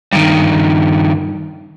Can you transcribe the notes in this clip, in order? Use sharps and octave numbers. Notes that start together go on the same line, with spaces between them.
G2 D#3